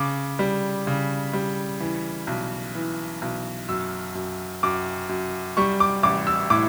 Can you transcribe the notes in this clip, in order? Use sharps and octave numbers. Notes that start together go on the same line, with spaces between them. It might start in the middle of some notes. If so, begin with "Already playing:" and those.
Already playing: C#3 D6
G3
C#3
G3
E3
B1
E3
B1
F#2 E6
F#2
F#2 D6
F#2
G3 C#6
D6
A1 D6
E6
A2 D6